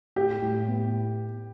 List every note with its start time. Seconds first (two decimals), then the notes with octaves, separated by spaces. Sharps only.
0.16 A2 G4
0.42 A2
0.68 B3